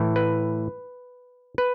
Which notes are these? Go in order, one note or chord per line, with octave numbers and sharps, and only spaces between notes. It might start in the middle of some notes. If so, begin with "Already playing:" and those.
Already playing: A2 E3
B4
B4